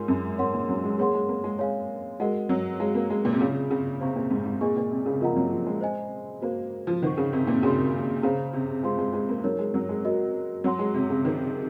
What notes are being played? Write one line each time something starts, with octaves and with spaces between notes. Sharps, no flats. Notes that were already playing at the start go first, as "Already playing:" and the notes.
Already playing: G#2 F4 A#4 C#5 G#5 C6
F#2
G#2 A#4 C#5 F#5 C6
A#2
F#3
G#3
A#3 G#4 C#5 F#5 C6
G#3
A#3
G#3
G#3 C#5 F5 G#5
G#3 F#4 A#4 D#5 F#5
F#3
G#3 F#4 C#5 F5 A#5
A#3
G#3
A#2
C3
C#3 F4 G#4 C#5
C#3
C3 C5 F5 A#5 C#6
A#2
G#2
G#2
A#2 G#4 D#5 G#5 C#6
A#2
C3
C#3
F3 F4 A#4 D#5 F#5 A#5
F#3
F3
G#3
C5 D#5 G#5
A#3 F#4 C5 F5
F3
D#3 C5 F#5 C#6
C#3
C3
A#2
C#3 F#4 A#4 F5 C6
C#3 G#4 C5 F5 A#5
C3
G#3 F4 C5 F5 C6
G#3
G#3
A#3
F#3 D#4 A#4 C#5
G#3
F#3
G#3
F#4 A#4 D#5
F#3 F#4 C#5 F#5 C6
G#3
C3
C#3
D#3 D#4 G#4 C5